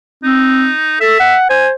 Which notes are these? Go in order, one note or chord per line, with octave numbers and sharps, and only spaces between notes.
C4 D#4
A4 E5
F#5
C5 G#5